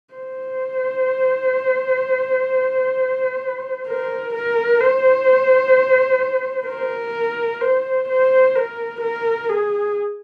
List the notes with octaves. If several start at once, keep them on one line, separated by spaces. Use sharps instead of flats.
C5
A#4
A#4
C5
A#4
C5
C5
A#4
A#4
G#4